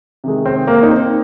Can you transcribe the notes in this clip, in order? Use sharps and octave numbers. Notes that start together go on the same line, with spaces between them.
C3 D#3 G#3
C4
A#3
D#4
C4